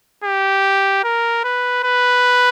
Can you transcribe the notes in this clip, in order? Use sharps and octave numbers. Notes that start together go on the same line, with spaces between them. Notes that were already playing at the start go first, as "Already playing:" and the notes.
G4
A#4
B4
B4